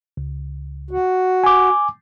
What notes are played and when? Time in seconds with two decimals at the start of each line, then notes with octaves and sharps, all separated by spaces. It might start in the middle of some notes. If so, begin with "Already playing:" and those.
0.17 C#2
0.91 F#4
1.44 G#5 D6